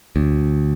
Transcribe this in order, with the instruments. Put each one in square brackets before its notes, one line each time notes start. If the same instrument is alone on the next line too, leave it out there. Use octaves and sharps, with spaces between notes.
[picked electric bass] D2